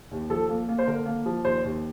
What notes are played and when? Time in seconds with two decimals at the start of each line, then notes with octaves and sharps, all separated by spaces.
0.11 D#2
0.30 F3 A4
0.49 A#3
0.69 A#3
0.79 C5
0.87 D3 A#4
1.06 A#3
1.26 F3
1.44 D#2 C5
1.64 D#2